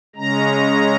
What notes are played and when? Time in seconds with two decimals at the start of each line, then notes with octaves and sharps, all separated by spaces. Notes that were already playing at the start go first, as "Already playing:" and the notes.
0.16 C#3 G#3 C#4 A#5